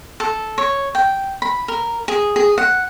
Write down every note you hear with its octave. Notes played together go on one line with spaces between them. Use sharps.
A4
C#5
G5
B5
A#4
G#4
G#4
F#5